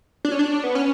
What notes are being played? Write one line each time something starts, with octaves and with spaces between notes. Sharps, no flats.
D4
C#4
D4
B3
C#4